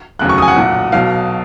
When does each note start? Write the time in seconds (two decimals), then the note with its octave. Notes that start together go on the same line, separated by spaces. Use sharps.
0.19 F1 D#2 C#3 F#3 F#6
0.29 C#6
0.38 G#5 D#6
0.48 F#5
0.56 B1 A#2 F#3
0.92 B1 B2 F#3 F5